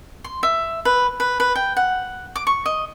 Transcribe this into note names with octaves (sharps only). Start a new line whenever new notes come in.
C6
E5
B4
B4
B4
G5
F#5
D6
C#6
D#5